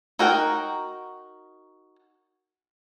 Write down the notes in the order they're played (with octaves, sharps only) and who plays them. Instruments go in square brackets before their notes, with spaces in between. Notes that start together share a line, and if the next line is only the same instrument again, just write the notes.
[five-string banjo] D#4 F#4 A#4 G5